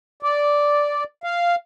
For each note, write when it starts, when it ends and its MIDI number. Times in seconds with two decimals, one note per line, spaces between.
0.23 1.04 74
1.24 1.56 77